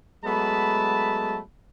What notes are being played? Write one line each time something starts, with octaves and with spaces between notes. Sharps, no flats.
F#3 G#3 A3 B3 A5 B5